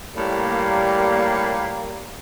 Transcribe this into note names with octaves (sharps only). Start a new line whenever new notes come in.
A2 G3 A#3